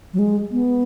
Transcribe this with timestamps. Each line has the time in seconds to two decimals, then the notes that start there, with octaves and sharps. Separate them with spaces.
0.13 F#3
0.19 G#3
0.52 B3